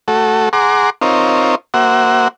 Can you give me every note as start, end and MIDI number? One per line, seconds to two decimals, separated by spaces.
0.08 0.49 57
0.08 0.49 66
0.08 0.49 69
0.53 0.90 68
0.53 0.90 78
0.53 0.90 82
0.53 0.90 84
0.53 0.90 86
1.02 1.55 60
1.02 1.55 63
1.02 1.55 65
1.02 1.55 70
1.02 1.55 73
1.74 2.28 58
1.74 2.28 66
1.74 2.28 72
1.74 2.28 76
1.74 2.28 78